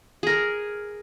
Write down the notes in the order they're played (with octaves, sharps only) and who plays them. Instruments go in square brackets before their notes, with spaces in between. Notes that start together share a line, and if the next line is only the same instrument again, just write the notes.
[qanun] G#4 A#4